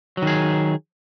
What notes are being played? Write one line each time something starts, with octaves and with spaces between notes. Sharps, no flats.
D#3 F#3 G#4